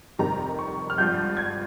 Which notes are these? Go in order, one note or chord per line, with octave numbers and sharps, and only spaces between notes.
F1 F2 C3 D#3 G3 A#5
C#6
F6
G#1 G2 F3 G6
G#6